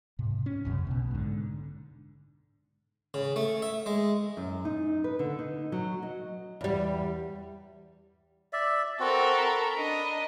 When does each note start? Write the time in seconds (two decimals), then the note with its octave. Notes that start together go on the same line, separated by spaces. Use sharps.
0.19 G#2 C3
0.46 C#4
0.65 E1 F#2 C#3
0.87 B1 B2
1.11 G#2 D3
3.14 C#3
3.36 A3
3.62 E5
3.86 G#3
4.37 F#2
4.65 D#4
5.04 B4
5.19 D3
5.39 D#4
5.72 F#3
6.03 D#5
6.61 E2 G3
8.53 D5 E5
9.00 C4 F#4 A4 A#4
9.38 A#5 B5
9.76 D4 D#5